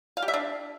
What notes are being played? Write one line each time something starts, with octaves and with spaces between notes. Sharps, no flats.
F5
G4
E5
D4